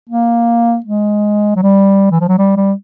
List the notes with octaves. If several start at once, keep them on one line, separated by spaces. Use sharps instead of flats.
A#3
G#3
F#3
G3
E3
F3
F#3
G3
G3